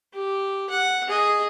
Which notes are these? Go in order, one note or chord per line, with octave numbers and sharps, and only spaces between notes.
G4
F#5
G#4 D#5